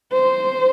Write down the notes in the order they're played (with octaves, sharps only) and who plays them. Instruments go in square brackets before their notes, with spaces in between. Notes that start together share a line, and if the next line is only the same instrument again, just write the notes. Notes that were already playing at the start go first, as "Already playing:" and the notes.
[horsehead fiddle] C5